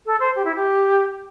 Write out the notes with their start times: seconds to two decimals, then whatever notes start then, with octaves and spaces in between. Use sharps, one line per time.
0.06 A4
0.20 C5
0.35 G4
0.45 E4
0.55 G4